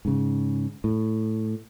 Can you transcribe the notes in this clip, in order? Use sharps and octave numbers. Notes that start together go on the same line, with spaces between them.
G#2 C#3
A2